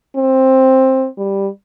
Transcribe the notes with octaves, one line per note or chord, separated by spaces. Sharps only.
C4
G3